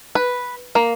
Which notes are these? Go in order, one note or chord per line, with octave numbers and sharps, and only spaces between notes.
B4
A#3